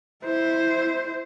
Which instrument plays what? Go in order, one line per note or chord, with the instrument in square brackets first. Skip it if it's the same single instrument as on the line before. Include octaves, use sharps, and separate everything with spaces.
[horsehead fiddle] E4 C5